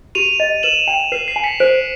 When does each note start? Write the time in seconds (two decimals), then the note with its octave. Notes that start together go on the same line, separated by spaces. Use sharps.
0.15 G4 D#7 F7
0.40 D#5
0.63 B4 E7 F#7
0.88 G5
1.12 B4 C7
1.28 C7
1.36 G#5
1.43 B6 C#7
1.60 C5 C7 D7